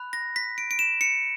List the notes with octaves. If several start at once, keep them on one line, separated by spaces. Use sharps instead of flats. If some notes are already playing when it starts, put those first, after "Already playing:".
Already playing: B5 F#6
A#6
B6
D7
D7
E7
C#7